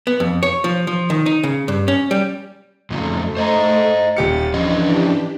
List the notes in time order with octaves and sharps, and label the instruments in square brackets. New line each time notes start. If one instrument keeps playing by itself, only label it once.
[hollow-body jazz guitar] B3
F2
C#5
F3
F3
D#3
D#4
C#3
G2
C#4
G3
[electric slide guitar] F2 C#3 F#3 [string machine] A3
[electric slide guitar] C5 D#5 A#5
[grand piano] D#1 G4 C#7 [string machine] A6
[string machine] E3 D4 G4 [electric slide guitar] F3 C#4 F4 [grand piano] D#5